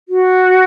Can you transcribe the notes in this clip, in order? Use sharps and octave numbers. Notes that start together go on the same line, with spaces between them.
F#4